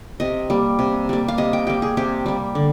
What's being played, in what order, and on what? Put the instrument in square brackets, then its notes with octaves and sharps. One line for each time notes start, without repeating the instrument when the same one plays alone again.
[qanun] C3 D#5
G3 A#3
C3
G3 A#3
F5
C3 D#5
G5
G3 A#3 G5
G#4
C3 G4
G3 A#3
D3